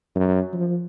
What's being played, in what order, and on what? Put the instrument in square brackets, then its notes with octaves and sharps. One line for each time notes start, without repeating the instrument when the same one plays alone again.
[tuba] F#2
F3